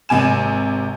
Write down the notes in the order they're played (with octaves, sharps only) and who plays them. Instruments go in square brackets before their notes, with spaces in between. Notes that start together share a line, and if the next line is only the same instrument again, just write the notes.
[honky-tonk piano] G#1 C3 G#5 E7